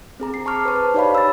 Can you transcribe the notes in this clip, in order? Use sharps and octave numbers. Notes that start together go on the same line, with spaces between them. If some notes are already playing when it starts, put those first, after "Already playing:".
C4 G#4 A#5
C7
A5 C#6 D6 F6
B4 C5 A5
D#4 G4 C#5 D5 F5 B5
E6 A6